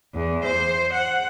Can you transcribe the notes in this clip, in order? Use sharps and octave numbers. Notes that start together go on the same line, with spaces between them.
E2
C5
F#5